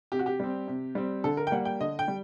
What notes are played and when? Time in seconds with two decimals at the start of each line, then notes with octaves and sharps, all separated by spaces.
0.12 C3 G4
0.19 F#4
0.26 G4
0.40 G3 C4
0.68 C3
0.95 G3 C4
1.24 D3 A4
1.37 A#4
1.47 G5
1.52 G3 A#3 F#5
1.65 G5
1.81 D3 D#5
1.99 G5
2.08 G3